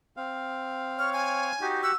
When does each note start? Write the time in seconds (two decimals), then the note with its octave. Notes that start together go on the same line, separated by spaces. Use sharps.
0.17 C4 F5
0.99 C#5 F6
1.13 G#5
1.61 D#4 F#4 G4
1.83 F#5 E6